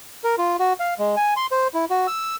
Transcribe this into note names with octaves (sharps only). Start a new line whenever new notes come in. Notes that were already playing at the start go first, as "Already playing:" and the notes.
A#4
F4
F#4
F5
G#3
G#5
C6
C5
E4
F#4
E6